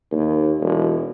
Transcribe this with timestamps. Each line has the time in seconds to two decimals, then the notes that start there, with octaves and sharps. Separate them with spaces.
0.12 D#2
0.60 E1